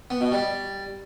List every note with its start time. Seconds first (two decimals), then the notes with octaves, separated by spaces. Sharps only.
0.10 B3
0.21 B2
0.32 G3